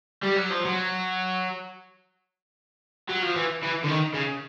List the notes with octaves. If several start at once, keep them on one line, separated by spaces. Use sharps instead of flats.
G3
F#3
F3
F#3
F#3
F3
E3
E3
D3
D#3
C#3